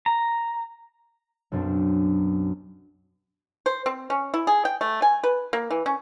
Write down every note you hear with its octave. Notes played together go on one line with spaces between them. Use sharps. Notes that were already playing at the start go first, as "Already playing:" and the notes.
A#5
B1 F#2 C4 D4
C5
C4
C#4
E4
G#4
G5
A3
G#5
B4
A#3
E3
C#4